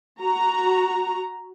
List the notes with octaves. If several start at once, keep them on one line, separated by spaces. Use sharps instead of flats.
F#4 A#5